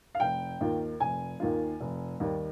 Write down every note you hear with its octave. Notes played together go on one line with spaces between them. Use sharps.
F5
F1 G5
D#2 D#3 A#3 F4
F1 G#5
D#2 D#3 A#3 F4
F1
D#2 D#3 G3